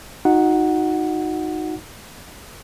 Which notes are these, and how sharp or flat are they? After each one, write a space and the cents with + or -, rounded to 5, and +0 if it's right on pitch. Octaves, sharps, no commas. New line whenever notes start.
D#4 +0 F#4 -30 F#5 +0